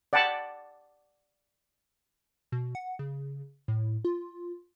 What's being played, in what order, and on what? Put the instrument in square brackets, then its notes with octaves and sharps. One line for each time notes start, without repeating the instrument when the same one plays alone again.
[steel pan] D5 F#5 G5 A5 B5
[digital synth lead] B2
F#5
C#3
A2
F4